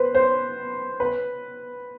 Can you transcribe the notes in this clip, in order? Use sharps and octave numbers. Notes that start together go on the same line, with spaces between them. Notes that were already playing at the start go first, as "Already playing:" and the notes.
Already playing: B4 C5
C5
B4